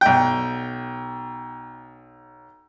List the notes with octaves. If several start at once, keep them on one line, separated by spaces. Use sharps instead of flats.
B1 G5